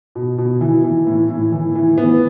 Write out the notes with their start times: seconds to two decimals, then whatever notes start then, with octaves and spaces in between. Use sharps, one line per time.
0.15 B2
0.38 B2
0.61 E3
0.84 E3
1.07 A2
1.30 A2
1.52 E3
1.75 E3
1.98 E3 B3